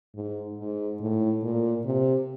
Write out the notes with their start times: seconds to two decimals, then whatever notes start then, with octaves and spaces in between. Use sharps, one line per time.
0.15 G#2
0.58 G#2
1.00 A2
1.43 A#2
1.85 C3